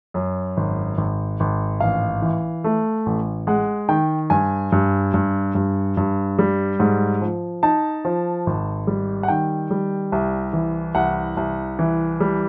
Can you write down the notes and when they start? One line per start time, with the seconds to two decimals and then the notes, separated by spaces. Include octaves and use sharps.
0.14 F#2
0.57 G#1
0.97 G#1
1.40 G#1
1.80 A1 F5
2.22 E3
2.64 A3
3.06 A1
3.47 G#3 F#5
3.89 D#3 G5
4.30 G2 G#5
4.72 G2
5.14 G2
5.55 G2
5.97 G2
6.39 G3
6.80 G#2
7.21 F3
7.63 D#4 A5
8.05 F3
8.47 G#1
8.87 G3
9.23 F#5
9.28 D#3 G5
9.70 G3
10.12 C2
10.53 E3
10.95 C2 F#5
11.37 C2
11.79 E3
12.20 G3